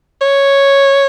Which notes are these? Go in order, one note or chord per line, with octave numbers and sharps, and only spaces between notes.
C#5